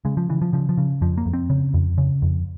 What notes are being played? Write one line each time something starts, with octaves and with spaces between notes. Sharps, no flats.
C#3 G#3
F3
C#3 E3
F3
C#3 F3
F3
C#3
F2 F3
A#3
F2
C4
C#3
F2
C#3
F2